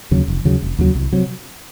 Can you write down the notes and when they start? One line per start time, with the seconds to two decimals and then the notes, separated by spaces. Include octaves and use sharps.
0.11 D#2 C#3 F#3
0.28 F1
0.45 D#2 C#3 F#3
0.62 F1
0.79 D#2 C#3 F#3
0.95 C2
1.12 C3 F#3